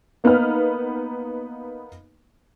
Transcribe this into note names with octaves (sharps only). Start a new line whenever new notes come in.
A#3 B3 D#4 B4 F6